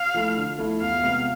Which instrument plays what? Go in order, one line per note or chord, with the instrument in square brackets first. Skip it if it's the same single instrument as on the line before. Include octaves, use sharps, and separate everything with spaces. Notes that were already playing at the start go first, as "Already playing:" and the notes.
Already playing: [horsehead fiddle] F5
[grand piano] F3 A3 E4
D3
F3 A3 E4
[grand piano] E2 [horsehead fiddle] F5
[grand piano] C3 G#3 B3 F4